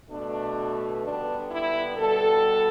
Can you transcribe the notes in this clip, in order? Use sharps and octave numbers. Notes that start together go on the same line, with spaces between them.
B2 A3 D4
D3 G3 B3 D4
E4
B2 G3 B3 A4